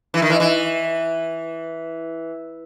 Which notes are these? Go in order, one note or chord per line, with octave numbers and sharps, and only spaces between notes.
E3
D#3
E3
E3